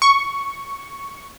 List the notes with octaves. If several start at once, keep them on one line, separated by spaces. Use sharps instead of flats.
C#6